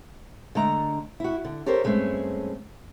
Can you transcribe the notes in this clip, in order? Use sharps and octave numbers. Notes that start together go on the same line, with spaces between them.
D3 G#3 A3 A#5
E4 F#4
D3
G4 A4 A#4 C5 C#5
G2 G#3 A3 C4 C#4